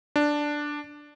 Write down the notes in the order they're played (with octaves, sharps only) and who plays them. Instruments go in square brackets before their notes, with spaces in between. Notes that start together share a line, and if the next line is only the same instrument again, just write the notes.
[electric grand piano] D4